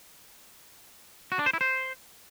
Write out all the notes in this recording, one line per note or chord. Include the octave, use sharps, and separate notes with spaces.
F#4
D4
C5
E4
C5